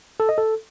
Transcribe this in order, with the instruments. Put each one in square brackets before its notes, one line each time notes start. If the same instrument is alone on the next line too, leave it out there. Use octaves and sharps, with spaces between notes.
[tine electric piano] A4
D#5
A4